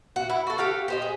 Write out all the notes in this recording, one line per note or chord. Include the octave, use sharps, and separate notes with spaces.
F#4
E4
F#4 A4
G4 A4 F5 F#5
G4 C5 D#5
G#4